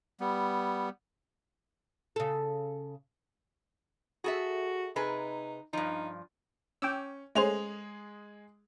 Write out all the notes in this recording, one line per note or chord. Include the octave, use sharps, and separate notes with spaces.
G3 B3
C#3 A4
F#4 G#4 A4 E5
C3 D#4 G#4 B4
G2 F3 D#4
C#4 G5 D6 E6
G#3 A3 C#4 G#4 C5 F7